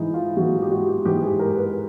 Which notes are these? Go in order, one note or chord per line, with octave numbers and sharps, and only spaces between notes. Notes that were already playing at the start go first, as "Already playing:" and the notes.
Already playing: G#2 E3 D#4 E4
F4
G#2 E3 F#4
G4
F#4
G4
G#2 E3 G4
G#4
A#4
B4